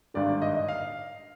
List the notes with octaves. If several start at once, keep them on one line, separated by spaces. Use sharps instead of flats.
G#1 G2 D3 D5
D5
D#5
D#5
F5